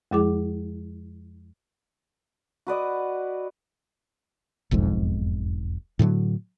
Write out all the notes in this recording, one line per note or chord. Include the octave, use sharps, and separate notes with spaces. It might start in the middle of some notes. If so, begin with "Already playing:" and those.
F2 F3 G#3 E4 G#4 D6
F#4 B4 D5 D#5
E1 B1 F2 G#2
A2 D3 F3 F#3